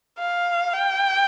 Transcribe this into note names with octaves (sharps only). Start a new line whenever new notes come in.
F5
G5